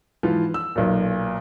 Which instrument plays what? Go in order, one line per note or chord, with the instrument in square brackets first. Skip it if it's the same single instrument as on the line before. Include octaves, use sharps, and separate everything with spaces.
[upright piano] G#2 E3 F3 F4
E6
B1 A#2